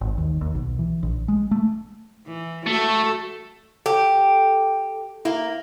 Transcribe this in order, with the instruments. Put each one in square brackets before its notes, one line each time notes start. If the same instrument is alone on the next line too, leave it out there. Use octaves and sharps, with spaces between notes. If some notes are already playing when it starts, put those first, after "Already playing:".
[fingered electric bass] G#1
D#2
D#2
B1
E3
A#1
G#3
A3
[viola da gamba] E3
[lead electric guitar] A3 [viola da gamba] F#4 A4
[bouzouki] G4 [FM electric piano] A4
[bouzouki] A#3 [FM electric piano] E4